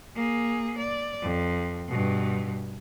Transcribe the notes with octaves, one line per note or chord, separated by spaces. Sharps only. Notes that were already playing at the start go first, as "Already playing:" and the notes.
A#3 G#4
D5
F2
G2 B2